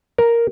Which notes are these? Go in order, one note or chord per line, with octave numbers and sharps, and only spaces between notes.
A#4